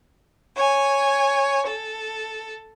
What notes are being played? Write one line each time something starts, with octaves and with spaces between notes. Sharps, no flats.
C#5 G#5
A4